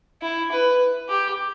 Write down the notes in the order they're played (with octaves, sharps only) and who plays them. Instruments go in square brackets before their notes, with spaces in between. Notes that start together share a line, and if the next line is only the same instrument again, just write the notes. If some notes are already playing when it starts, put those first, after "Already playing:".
[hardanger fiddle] E4
B4
G4